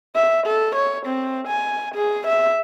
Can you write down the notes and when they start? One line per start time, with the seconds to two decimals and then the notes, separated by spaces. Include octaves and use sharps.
0.16 E5
0.47 A4
0.75 C#5
1.06 C4
1.47 G#5
1.95 G#4
2.27 E5